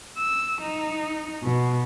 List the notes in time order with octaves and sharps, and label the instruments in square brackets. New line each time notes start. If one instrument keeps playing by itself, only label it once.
[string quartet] E6
D#4
B2